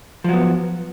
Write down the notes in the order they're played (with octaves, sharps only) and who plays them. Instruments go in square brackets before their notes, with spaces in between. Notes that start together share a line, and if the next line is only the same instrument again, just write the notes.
[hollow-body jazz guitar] F3
F#3
B3